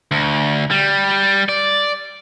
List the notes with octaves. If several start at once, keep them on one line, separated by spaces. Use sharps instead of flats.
D2
G3
D5